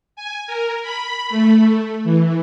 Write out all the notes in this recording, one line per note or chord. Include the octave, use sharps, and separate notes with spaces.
G#5
A#4
B5
A3
E3